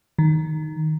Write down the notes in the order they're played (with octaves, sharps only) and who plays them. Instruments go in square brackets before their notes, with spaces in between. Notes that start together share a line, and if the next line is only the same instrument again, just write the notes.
[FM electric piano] D#3